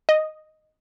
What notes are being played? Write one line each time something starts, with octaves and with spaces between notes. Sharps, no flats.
D#5